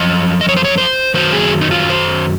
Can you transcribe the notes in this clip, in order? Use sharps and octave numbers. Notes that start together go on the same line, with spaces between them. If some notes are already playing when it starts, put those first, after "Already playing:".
Already playing: F#2 F3 D#5
D#5
C#5
C5
C#5
C5
F#2 D#3 F#3 C5
G#4
D#4
F4
C5